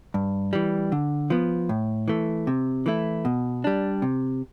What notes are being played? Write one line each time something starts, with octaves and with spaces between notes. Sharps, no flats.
G2
E3 G3
D3
F3 B3
A2
E3 A3
C3
E3 A3 E4
B2
G3 D4
C3